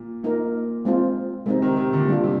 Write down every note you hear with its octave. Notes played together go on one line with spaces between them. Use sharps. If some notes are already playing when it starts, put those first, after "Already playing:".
Already playing: A#2
A#2 A#3 D#4 A#4
G#3 C4 F4
C3 G#3 C4 D#4
C3 D#3
C3 D#3
A#2 D3
A#2 G3 D4 F4
C3